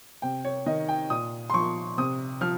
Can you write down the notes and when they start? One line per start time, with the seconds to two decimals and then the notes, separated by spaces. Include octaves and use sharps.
0.22 C3 G5
0.45 C#5
0.66 D#3 D#5
0.89 G5
1.10 A#2 D#6
1.50 C6
1.54 F3 C#6
1.98 C3 D#6
2.41 F3 F6